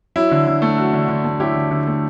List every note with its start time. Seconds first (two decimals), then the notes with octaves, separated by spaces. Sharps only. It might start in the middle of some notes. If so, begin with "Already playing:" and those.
0.16 F#3 E4
0.31 D3
0.47 D3
0.62 A3
0.78 F#3 F#4
0.93 D3
1.09 D3
1.24 A3
1.40 F#3 E4 G4
1.55 D3
1.71 D3
1.87 A3